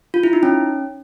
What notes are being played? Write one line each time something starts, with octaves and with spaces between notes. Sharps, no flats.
F4
E4
D#4
C#4